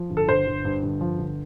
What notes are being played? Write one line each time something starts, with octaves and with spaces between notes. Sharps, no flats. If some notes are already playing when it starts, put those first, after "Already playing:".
Already playing: F3
G1
A4
G1 C5
G1
G2
G1
F3
G1